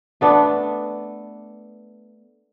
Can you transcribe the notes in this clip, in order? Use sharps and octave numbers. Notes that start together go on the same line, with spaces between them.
A3 B3 D4